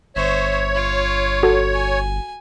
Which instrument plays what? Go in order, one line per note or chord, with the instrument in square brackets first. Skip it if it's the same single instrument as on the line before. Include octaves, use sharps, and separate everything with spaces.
[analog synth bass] G1 [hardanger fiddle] C5 E5 [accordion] C#5
[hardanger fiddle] F4
[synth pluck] F#4 A4
[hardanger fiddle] G#5